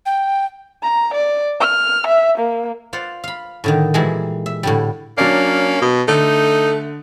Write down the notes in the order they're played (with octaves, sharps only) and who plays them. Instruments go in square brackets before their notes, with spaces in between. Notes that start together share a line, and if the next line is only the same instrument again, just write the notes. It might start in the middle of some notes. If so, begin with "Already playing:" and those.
[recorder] G5
[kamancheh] A#5
D5
F6
E5
A#3
[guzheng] F4 C5 D5 F#5
F5 B5
A2 D3 D#3
A#2 E3 G3 G#3
E5
A2 D3 G3
[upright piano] F#3 D4 [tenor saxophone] A#3 [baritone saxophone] C#4
[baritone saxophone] B2
[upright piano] D3 [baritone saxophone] A3 [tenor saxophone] D#4